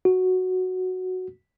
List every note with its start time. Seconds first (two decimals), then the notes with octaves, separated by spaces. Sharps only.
0.05 F#4